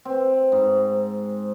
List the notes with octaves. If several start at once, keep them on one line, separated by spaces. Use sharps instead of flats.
C4
G#2